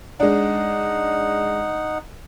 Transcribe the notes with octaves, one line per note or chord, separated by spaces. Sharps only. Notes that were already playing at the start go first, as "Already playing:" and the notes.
G#3 D4 D#4 F#5